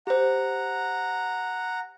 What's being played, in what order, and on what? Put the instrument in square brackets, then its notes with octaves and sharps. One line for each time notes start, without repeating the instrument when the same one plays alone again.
[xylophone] G4 C5 [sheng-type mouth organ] F#5 A#5